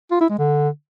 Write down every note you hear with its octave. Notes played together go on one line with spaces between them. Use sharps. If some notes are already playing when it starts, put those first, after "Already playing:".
F4
E4
G#3
D3